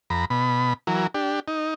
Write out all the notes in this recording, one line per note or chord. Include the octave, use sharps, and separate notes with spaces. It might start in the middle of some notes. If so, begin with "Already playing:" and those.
F2 A#5 B5
B2 B5
E3 F#3 A#4
D4 G4
D#4